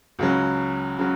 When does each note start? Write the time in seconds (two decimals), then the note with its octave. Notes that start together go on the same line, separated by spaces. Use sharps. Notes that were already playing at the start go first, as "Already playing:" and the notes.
0.19 C#2 C#3 F#3
0.99 C#3 F#3